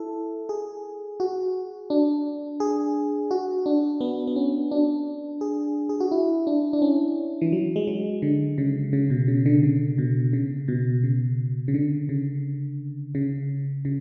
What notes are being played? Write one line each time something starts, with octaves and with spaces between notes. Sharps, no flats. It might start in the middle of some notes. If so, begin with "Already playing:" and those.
Already playing: E4 A4
G#4
F#4
D4
G#4
F#4
D4
B3
B3
C#4
D4
G#4
G#4
F#4
E4
D4
D4
C#4
E3
F#3
G#3
F#3
D3
C#3
C#3
B2
C#3
D3
C#3
B2
C#3
B2
C#3
C#3
D3
C#3
C#3
C#3